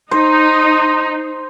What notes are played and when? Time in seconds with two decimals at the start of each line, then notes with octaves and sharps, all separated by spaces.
0.11 D#4 C5